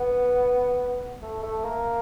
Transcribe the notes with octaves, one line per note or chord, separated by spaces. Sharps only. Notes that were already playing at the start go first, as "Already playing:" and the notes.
Already playing: B3
A3
A3
A#3